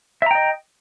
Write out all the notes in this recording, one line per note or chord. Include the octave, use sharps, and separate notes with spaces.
D#5 E5 G5 A#5